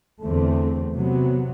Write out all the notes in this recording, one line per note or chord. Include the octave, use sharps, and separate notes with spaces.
E2 D3 A3 C4
C3 F#3 B3